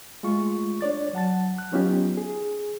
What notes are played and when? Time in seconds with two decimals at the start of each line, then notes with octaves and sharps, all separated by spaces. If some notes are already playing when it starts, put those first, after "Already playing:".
0.23 G#3 A3 F4 C#6
0.81 D4 C#5 D5 A6
1.13 F#3 F#5 A5 A6
1.58 F#6
1.72 F#3 B3 C#4 D#4 F4 G4
2.17 G#4